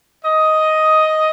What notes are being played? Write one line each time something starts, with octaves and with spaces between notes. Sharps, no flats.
D#5